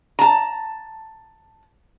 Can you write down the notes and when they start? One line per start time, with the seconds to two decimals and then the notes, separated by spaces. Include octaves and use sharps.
0.19 A5 A#5